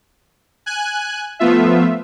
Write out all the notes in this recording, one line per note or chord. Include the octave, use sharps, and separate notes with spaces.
G#5 F#6
F3 A3 B3 F4 E5